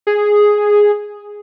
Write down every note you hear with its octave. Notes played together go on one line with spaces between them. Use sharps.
G#4